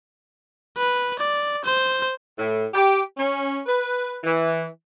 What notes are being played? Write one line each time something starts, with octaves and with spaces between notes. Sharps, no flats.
B4
D5
C5
A2
G4
C#4
B4
E3